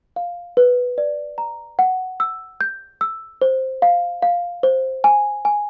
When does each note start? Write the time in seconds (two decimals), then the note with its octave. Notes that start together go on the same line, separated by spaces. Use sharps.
0.16 F5
0.57 B4
0.98 D5
1.38 A#5
1.79 F#5
2.20 E6
2.61 G6
3.01 E6
3.42 C5
3.82 F5
4.22 F5
4.63 C5
5.04 G#5
5.45 G#5